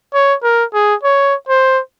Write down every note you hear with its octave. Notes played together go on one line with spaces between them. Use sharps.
C#5
A#4
G#4
C#5
C5